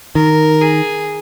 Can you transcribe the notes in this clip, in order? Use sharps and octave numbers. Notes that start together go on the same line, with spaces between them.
D#3 A#4
G#4